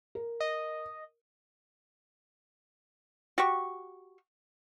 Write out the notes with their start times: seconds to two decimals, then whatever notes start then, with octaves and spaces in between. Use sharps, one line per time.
0.15 A#4
0.40 D#5
3.38 F#4 G4 C#6